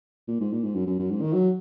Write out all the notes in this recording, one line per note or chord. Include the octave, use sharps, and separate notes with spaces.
A#2
G#2
A#2
G#2
F#2
F#2
F#2
G#2
D#3
F#3